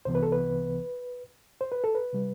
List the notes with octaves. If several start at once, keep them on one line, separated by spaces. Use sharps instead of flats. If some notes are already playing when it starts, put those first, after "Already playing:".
C2 C3 E3 B3 C5
B4
A4
B4
C5
B4
A4
B4
C3 G3